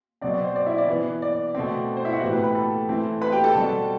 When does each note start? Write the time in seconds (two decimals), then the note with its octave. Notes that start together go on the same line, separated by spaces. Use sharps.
0.21 B2 F#3 C4 D5
0.34 D5
0.44 C5
0.56 D5
0.67 E4 E5
0.78 D5
0.88 E3 B3
1.22 D5
1.55 B2 A3 C4
1.97 C5
2.05 E4 E5
2.13 F#4 F#5
2.22 A2 E3 B3 G4 G5
2.33 B4 B5
2.43 B4 B5
2.55 A4 A5
2.89 E3 A3 C4
3.21 B4 B5
3.32 G4 G5
3.44 A4 A5
3.55 B2 G3 C4